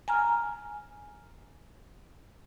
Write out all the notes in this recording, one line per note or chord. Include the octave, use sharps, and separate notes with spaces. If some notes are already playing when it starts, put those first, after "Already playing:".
G#5 A#5 F6